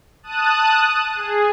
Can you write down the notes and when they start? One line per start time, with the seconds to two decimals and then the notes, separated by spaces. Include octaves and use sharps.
0.23 A5 D#6 F#6 D#7
1.15 G#4